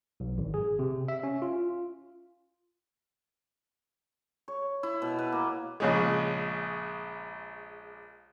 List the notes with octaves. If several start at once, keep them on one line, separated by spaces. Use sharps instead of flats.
B1
G#1
G#4
C3
E5
C#4
F4
C#5
E4
B2
B4
A#3
A#1 C#3 G#3